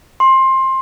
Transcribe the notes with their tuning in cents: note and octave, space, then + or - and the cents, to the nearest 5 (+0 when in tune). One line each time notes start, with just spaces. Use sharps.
C6 +20